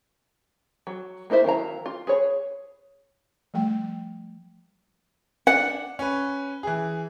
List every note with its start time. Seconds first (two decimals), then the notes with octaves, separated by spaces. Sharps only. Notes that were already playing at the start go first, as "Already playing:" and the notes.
0.87 F#3
1.30 A#3 D#4 E4 C5 E5
1.44 D#3 F#3 E4 F5 A#5
1.86 F4
2.07 G#4 B4 C#5
3.54 F3 G3 A3 G5
5.47 D4 F#5
5.99 C#4 B4
6.63 E3 G#4